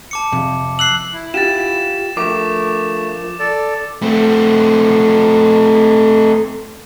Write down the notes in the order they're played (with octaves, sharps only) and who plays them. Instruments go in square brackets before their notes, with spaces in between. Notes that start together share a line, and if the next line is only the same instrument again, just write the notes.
[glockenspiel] A5 D6 C#7
[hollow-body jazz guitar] F2 C3
[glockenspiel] E6 F#6 C7 [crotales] F#7
[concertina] E4
[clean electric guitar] F4 G4 [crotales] A6 E7
[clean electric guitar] F3 A#4 [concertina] A3 [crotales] D6
[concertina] A4 D5
[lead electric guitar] A3 C4